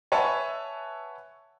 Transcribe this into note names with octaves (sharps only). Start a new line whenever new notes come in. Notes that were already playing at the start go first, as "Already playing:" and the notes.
B4 C#5 E5 F#5 G#5 A5